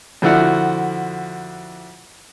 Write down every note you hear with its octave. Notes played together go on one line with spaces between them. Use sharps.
F2 D3 F3 E4 F#4 F#5